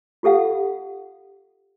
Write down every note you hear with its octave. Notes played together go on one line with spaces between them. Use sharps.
F4 G4 A4 F5 F#5